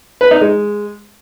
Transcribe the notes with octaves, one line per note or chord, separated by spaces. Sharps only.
B4
D#4
G#3